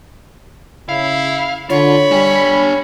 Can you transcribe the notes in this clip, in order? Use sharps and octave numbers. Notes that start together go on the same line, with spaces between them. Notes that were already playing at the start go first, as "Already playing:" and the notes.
C#3 E4 F5
D3 F4 C#5 B5
G3 D4 G#5